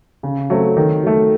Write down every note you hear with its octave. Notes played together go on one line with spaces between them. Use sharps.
C#3
F#3 A3 C4
D#3
F#3 A3